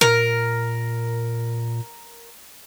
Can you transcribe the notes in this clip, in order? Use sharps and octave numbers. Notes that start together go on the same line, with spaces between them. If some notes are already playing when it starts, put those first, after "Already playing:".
A#2 A#4